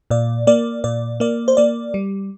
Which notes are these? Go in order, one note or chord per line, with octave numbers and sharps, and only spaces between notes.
A#2 D5
A#3 D5
A#2 D5
A#3 D5
C5
A#3 D5
G3